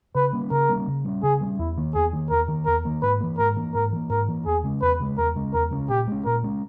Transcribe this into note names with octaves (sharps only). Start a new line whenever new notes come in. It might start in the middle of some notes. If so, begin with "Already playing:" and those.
C#3 B4
G3 A#3 C#4
C#3 A#4
G3 A#3 C#4
C#3
G3 A#3 C#4
C#3 G#4
G3 A#3
C#4
E2 E4
D#3 A#3
E2 G#4
D#3 A#3
E2 A#4
D#3 A#3
E2 A#4
D#3 A#3
G#2 B4
E3 A#3
G#2 A#4
E3 A#3
G#2 A#4
E3 A#3
G#2 A#4
E3 A#3
E2 G#4
C#3 G#3 C#4
E2 B4
C#3 G#3 C#4
E2 A#4
C#3 G#3 C#4
E2 A#4
C#3 G#3 C#4
A#2 G4
G#3 C#4
A#2 A#4
G#3 C#4